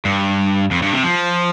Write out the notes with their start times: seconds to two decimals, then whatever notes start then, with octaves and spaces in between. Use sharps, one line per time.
0.05 G2
0.71 F2
0.82 G2
0.93 C3
1.04 F3